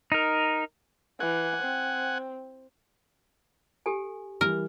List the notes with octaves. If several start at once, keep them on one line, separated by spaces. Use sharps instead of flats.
D#4 A#4
E3 F#5 G#5
C4
G4 A4 G#5
E3 G3 A#4